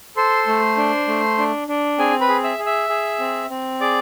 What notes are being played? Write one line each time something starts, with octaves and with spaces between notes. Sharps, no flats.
A4 C5 C6
A3
D4
A3
D4
D4
C4 G#4 G#5
B4 B5
G#4
E5 E6
G#4
E5 E6
G#4
C4
C4
G#4 D5 D6